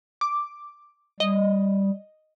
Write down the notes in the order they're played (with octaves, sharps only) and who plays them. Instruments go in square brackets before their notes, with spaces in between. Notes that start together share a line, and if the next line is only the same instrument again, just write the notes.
[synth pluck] D6
[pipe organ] G3 [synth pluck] D#5